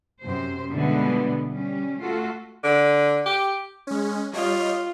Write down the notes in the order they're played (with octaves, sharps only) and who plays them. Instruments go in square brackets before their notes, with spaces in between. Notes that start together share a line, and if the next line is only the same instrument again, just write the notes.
[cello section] F#2 C3 C5
B2 D3 E3 G3 G#3 B3
G3 C#4
A3 F4 F#4 A4
[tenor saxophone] D3
G4
[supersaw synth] G#3 C#4
[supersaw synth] G3 C#5 D#5 [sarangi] F4